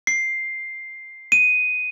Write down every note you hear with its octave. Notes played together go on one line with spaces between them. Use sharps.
C7
D#7